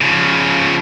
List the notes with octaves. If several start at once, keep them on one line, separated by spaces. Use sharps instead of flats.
C#3 F3